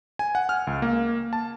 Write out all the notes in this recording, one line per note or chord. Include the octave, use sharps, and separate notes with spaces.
G#5
F#5
F6
C#2
A#3
A5